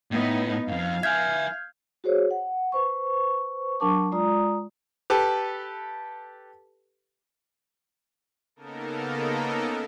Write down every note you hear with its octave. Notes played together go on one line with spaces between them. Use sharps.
A2 B3 D#4
F2 G#2 F5
E5 G#5 F6 G6 G#6
F#4 G#4 C5 C#5
F#5
B4 C5 C#6
F#3 D4 A#4 A5 C#6 D6
G#3 F4 D5 A#5 D#6
G4 A4 B4
C#3 A#3 B3 D#4 A4 A#4